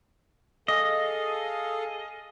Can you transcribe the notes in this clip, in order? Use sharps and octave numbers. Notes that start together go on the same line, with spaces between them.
G#4 A4 D#5 F5